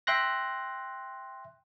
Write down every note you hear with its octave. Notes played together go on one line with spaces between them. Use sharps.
E5 G5 C6 F#6 A#6